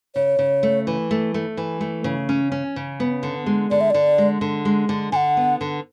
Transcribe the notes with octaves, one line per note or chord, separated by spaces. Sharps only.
C#3 C#5
C#3
A3
E3
A3
A3
E3
A3
C#3
C#4
C#4
C#3
B3
D3
G#3
D3 D5
E5
D3 D5
G#3
D3
G#3
D3
D3 F#5 G#5
B3
D3